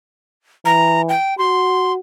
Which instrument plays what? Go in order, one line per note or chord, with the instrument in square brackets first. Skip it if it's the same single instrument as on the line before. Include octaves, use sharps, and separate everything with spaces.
[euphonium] E3 [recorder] A#5
[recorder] G5
[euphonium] F#4 [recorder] C6